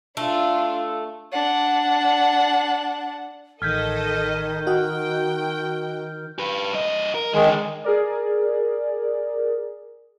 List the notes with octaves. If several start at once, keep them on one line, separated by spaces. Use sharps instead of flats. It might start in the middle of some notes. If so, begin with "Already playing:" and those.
A3 D4 F4
D4 F#5
A1 D#3 A4 D#5 F6 G6 G#6 B6
F#4 D#5 G5 F#6
G4 B4
G2 D#5
A#4
D3 D#3 G#3 G#4
G#4 A#4 D5